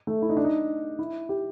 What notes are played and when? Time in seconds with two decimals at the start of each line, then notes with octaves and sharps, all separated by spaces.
0.07 A3
0.22 E4
0.29 D#4
0.37 D4
0.44 D#4
0.99 E4
1.29 G4